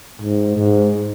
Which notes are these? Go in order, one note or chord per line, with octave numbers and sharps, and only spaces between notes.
G#2
G#2